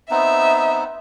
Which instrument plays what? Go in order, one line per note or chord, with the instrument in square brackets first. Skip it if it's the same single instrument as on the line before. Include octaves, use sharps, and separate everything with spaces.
[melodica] B3 C4 D#4 [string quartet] E5